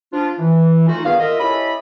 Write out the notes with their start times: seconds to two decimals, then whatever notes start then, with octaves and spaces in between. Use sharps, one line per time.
0.13 F3 D4 F4
0.39 E3
0.87 A3 D#4 F4 F#4
1.05 G2 D3 D#3 B3 G#4 F5
1.20 F4 A#4 D#5 E5
1.39 C#4 E4 G4 A4 D#5 B5